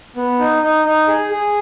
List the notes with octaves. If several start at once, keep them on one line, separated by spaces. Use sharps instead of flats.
B3
D#4
D#4
D#4
G#4
G#4